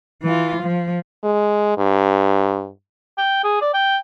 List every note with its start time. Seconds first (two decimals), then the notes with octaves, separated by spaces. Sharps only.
0.23 E3 F4
0.62 F3
1.24 G#3
1.78 G2
3.18 G5
3.44 G#4
3.62 D5
3.74 G5